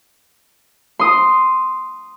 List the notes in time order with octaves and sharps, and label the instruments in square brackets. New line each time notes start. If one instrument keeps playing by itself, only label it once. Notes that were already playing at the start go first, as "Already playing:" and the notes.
[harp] C6 D#6